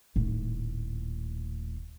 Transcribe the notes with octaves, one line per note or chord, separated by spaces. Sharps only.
D#1 A2